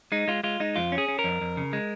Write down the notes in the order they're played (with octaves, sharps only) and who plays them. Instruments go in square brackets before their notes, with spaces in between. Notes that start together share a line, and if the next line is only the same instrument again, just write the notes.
[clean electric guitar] G#3 D#4
G#3 F4
G#3 F4
G#3 D#4
F2 F4
C#4
G#4
C#4
A#4
F2
F2
C#3
G#3